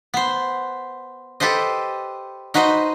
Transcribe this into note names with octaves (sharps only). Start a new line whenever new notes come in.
B3 C5
G4 A4 B4 C5 D#5
D#4 F#4 B4 C5 D#5